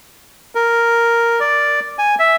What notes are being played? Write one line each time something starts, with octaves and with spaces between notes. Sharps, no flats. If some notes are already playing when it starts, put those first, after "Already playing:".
A#4
D5
G#5
E5